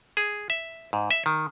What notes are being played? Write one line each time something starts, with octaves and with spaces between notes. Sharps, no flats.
G#4
E5
G#2
E5
D#3